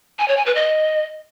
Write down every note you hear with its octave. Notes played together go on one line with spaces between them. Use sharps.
G#5
C#5
G#5
B4
D#5